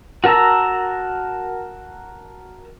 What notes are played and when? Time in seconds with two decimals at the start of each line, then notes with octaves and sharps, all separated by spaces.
0.24 F#4 A#4 A5 A#5 E6